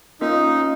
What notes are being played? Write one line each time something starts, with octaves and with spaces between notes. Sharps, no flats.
A#3 C#4 D#4 F4 A#4